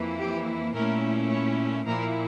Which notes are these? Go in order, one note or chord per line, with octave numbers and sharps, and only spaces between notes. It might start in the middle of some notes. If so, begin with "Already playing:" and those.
Already playing: F2 E3 A#3 E4
G4
A#2 A3 C#4 E4 A#4
C#5
A#2 F3 A#3 E4 A#4